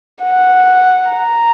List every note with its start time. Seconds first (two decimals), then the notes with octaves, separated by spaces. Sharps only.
0.24 F#5
1.11 A#5